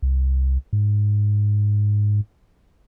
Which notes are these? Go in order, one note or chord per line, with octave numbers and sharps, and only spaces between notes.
C2
G#2